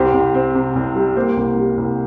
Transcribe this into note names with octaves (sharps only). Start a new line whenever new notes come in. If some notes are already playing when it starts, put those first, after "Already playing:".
Already playing: C2 G4 C5
C2
C4
C3
C2
G3
A#3 G4 C5
C2
G3
C2